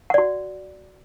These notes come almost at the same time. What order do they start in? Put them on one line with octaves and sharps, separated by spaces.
F#5 D5 F#4